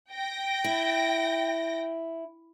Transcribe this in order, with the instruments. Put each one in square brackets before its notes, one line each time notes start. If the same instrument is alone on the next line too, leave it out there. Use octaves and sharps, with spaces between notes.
[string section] G5 A#6
[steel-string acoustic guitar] E4